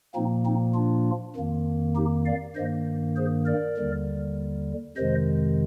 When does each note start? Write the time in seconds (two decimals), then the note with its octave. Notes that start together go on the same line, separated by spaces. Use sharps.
0.15 A#2 F3 A#3 C4 D#4
0.45 C4 D#4
0.75 D4 F4
1.36 F2 D#3 A#3
1.95 D#4 G4
2.25 D5 F5
2.56 G2 D#3 A#3 C5 D#5
3.16 G#4 C5
3.46 A#4 D5
3.77 D#2 D3 G3
4.97 F2 C3 D#3 G#3 C5 D#5